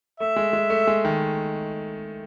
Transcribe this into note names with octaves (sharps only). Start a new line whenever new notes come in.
A3 E5
G#3
G#3
A3
G#3
D#3